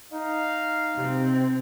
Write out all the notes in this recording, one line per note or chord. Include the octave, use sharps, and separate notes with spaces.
D#4 F5
C3 C4